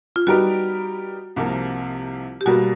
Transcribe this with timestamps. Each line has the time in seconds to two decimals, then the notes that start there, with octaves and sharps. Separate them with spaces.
0.16 F4
0.27 G3 B3 D#4 F#4 G4 A#4
1.36 C2 C3 F3 A#3
2.41 G4
2.46 B2 G3 A#3 F#4